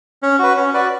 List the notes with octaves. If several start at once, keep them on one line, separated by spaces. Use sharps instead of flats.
C#4
F#4 B4
C#4
F#4 B4 D5